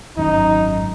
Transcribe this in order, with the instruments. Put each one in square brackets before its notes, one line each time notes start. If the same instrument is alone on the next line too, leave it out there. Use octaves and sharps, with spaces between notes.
[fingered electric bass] G#1 F#2 [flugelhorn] D#4